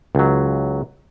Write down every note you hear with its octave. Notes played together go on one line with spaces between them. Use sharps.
C#2 F#3